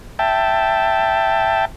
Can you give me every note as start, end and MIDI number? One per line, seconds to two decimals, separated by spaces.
0.19 1.65 76
0.19 1.65 79
0.19 1.65 81